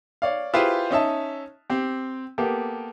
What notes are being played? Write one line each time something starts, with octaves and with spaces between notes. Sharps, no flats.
C#5 D5 F5
E4 F4 G4 G#4 B4 C5
C#4 D#4 E5 A5
C4 G4
A#3 B3 G4 A4